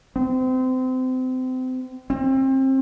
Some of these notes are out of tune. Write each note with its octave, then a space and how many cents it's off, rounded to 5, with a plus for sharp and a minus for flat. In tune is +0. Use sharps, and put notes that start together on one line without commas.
C4 -30
C4 +30